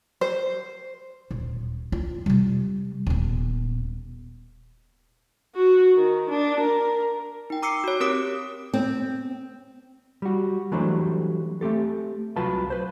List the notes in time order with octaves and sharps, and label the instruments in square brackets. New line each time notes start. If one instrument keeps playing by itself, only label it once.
[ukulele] C5
[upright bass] D#1
F4
C3 G3
D#1 B3
[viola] F#4
D#3
D4
A#4
[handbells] D#4 G5
A#5 D6 E6 C7 C#7
F#4 C#5
C4 G4 A#4 D6 D#6 D7
[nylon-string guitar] C4
[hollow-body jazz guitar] G3 F#4
E3 F#3 G3 A3 D4 C5
A3 C4 G4 A4
C2 F#3 F4 B4 A5
B4 C5